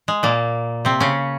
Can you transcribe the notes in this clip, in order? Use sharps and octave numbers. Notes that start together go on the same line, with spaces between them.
G#3
A#2 A#3
C3 C4
C#3 C#4